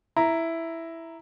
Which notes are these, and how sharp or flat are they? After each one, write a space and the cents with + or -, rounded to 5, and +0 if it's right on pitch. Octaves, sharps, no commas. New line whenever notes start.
E4 +0 A#5 +0